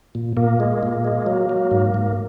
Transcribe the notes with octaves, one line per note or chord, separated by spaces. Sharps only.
A#2
A#2 A#3
G#3
A#2
G#3
F#3
F#3
G#2
G#2